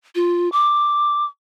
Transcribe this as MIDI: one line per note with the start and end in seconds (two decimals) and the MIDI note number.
0.15 0.49 65
0.52 1.25 86